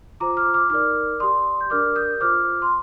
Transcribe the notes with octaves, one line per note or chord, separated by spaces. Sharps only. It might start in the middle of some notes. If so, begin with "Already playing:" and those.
F4 C5 A#5 D6
D6 F6
D6 F6
D#4 A#4 D5 D6 F6
G4 D5 C6 D#6
G6
D4 G4 A#4 D5 D6 F6
D#6 G6
F4 C5 D6 F6
C6